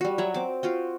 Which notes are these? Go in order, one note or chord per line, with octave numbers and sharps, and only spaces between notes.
G3 F#4
F#3 C#5 E5 F#5
C4 D6
F4 F#4 G5